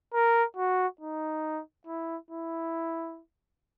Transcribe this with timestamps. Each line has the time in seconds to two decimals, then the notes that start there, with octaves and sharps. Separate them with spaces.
0.14 A#4
0.57 F#4
1.01 D#4
1.87 E4
2.31 E4